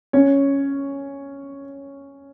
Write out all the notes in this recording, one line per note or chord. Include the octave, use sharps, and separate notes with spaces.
C#4 C#5